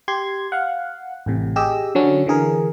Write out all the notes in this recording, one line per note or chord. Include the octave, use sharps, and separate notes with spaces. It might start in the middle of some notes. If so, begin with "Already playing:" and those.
G4 C6 G#6
F5 F#5
A1 A2 C3
G4 G#4 D#5 E6
D3 F#3 C#4 D4
D3 E3 G#4 A#4